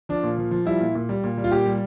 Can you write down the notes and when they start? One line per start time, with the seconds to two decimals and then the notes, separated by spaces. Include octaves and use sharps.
0.09 F3 D4
0.23 A#2
0.38 F3
0.51 F3
0.66 G3 E4
0.81 A#2
0.95 A#2
1.09 G3
1.24 A#2
1.38 G3
1.44 F4
1.52 A#2 G4
1.66 G3